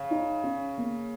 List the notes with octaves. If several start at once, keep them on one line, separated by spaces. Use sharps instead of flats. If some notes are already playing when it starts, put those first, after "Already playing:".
Already playing: C#3
D#4
C#4
A#3